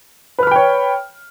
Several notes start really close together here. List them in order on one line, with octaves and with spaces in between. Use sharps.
B4 F6 B5 G5 C#5